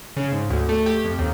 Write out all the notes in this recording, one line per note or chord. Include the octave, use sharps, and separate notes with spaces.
C#3
G#2
D2
A3
G4
F2
D#2